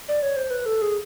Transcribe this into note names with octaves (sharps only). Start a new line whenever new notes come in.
D5
C#5
C5
B4
A4
G#4